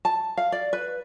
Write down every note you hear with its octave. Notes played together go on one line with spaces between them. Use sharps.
A5
F5
D5
B4